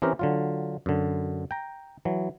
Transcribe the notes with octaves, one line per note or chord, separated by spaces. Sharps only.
E3 C4 C#4 G4 A#4
D3 F#3 F4
F#2 D3
G5 A#5
E3 F#3